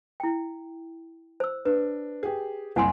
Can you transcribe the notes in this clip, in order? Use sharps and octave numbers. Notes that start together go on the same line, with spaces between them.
E4 G5
C5 E6
D4 B4
G4 G#4
F#1 C2 F#5 G#5 C6